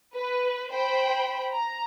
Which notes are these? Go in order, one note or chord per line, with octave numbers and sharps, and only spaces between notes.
B4
C5 G5 B5
A#5